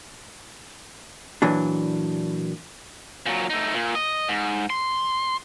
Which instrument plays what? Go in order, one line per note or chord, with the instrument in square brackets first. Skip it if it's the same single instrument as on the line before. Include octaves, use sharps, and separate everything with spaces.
[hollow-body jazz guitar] A#2 E3 F#3 D4
[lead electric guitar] A#2 F#3
A3 D#4
A#2
D#5
G#2
C6